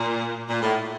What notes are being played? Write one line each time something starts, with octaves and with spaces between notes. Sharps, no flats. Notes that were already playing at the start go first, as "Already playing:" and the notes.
Already playing: A#2
A#2
A2